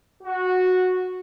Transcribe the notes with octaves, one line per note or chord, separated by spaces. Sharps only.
F#4